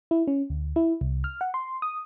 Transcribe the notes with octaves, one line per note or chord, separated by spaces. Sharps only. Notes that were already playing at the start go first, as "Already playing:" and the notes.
E4
C#4
D2
E4
C2
F6
F#5
C6
D#6